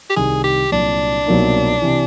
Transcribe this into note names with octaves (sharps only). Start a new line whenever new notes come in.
G4
C2 C3 D#3 G#4
G4
C2 A#2 F#3 D4
C2 B2 F#3 A#3 D#4
C3 E3